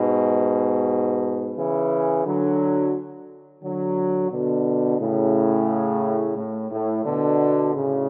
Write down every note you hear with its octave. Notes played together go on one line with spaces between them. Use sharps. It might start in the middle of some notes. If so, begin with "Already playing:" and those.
Already playing: G#2 B2
C#3 E3
D3 F#3
D3 F#3
B2 D3
A2 C#3
A2
A2
B2 D3
A2 C#3